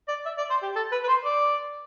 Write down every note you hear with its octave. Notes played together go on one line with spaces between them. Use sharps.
D5
E5
D5
C5
G4
A4
B4
B4
C5
D5